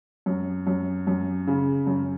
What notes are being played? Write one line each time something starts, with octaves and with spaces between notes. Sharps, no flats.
F#2
F#2
F#2
C#3
F#2